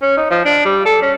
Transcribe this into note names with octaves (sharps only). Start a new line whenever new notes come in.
C#4
D#4
F3
D4
G3
A4
C#4